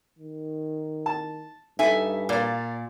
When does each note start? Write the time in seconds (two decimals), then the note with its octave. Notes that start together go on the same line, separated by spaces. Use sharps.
0.19 D#3
1.06 A5
1.79 G2 D#4 A4 E5 G#5
2.29 A#2 A#4 D5 F5